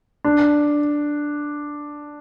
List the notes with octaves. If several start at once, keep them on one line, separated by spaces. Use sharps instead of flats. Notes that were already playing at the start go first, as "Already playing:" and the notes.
D4